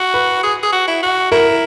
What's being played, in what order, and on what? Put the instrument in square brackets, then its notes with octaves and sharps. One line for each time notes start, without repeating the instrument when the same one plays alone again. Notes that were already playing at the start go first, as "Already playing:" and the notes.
Already playing: [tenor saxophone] F#4
[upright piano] B4
[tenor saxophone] G#4
G#4
F#4
E4
F#4
[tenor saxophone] E4 [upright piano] A#4